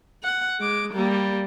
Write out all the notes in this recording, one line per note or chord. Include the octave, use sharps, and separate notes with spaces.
F#5
G#3 D6
G3 A#3